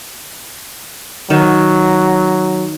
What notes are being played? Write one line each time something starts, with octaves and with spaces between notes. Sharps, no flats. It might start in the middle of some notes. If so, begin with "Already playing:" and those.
D#3 F#3